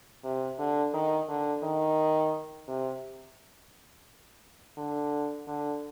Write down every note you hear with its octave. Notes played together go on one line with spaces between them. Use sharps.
C3
D3
D#3
D3
D#3
C3
D3
D3